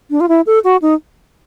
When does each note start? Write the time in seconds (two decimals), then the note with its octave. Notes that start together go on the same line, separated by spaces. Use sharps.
0.11 D4
0.20 F4
0.29 E4
0.47 A4
0.64 F#4
0.82 D#4